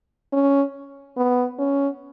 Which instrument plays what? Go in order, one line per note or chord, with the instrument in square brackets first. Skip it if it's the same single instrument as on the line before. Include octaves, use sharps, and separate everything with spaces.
[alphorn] C#4
B3
C#4